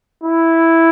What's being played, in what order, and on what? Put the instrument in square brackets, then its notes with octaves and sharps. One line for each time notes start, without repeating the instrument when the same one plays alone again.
[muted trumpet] E4